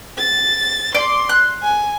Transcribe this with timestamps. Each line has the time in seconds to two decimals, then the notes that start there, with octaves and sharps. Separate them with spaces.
0.18 A6
0.95 D5 C6
1.29 F#6
1.63 G#5